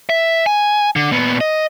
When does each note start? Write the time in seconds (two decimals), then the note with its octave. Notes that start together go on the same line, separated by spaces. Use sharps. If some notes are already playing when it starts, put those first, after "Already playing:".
0.09 E5
0.46 G#5
0.96 D3
1.11 A#2 B3
1.41 D#5